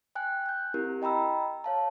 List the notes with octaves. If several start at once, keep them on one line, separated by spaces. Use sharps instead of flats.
G5 G#5 F#6
F#6 G6
C4 E4 G4 A#4
D#5 G5 A#5 B5 E6
C#5 F5 A5